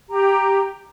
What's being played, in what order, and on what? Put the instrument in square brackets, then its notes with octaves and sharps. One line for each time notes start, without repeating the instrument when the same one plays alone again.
[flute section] G4 A#5